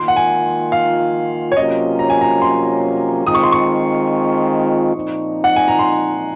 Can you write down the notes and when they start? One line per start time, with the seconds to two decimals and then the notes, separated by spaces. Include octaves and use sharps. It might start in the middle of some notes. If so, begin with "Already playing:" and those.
Already playing: D#3 A#3 F4 C6
0.08 F#5
0.16 G#5
0.72 F5
1.52 C#5
1.57 C3 F#3 A#3 C#4 F4 D#5
1.99 A#5
2.10 G#5
2.21 A#5
2.42 C6
3.26 D#3 G#3 C4 F4 D#6
3.35 C#6
3.43 C6
3.52 C#6
4.95 A#2 F3 C4 D#4
5.44 F#5
5.56 G#5
5.68 A#5
5.79 C6